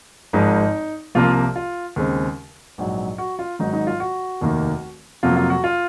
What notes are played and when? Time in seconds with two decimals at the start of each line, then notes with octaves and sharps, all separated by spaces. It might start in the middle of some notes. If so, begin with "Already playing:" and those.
0.33 G#1 G#2 F3 G#3 D#4
1.15 C2 C3 F3 A#3 F4
1.56 F4
1.96 D#2 C#3 G#3 C4
2.78 A#1 G#2 F#3
3.18 F#4
3.39 F4
3.59 G#1 G#2 D#3 F#3 D#4
3.73 D#4
3.87 F4
4.00 F#4
4.41 F1 D#2 D#3 A#3
5.23 F2 C3 F#3 A#3 F4
5.36 F4
5.50 F#4
5.64 F4